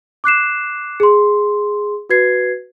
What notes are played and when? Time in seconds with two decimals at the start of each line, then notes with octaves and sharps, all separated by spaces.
0.24 D6 F#6 C7 E7
1.00 G#4 C6
2.09 F#4 B4 G#6 C7